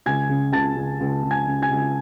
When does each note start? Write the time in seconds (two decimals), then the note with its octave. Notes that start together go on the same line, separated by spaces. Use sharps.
0.06 C#2 G#5 G#6
0.29 C#3
0.53 C#2 A5 A6
0.76 C#2
1.00 C#2
1.23 C#2
1.31 G#5 G#6
1.46 C#3
1.62 G#5 G#6
1.70 C#2